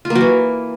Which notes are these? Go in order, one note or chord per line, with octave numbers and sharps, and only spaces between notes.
F4
A#3
F#3
E3